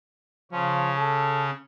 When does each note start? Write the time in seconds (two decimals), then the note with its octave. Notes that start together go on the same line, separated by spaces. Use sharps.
0.52 C#3 F3 C#4
0.97 A4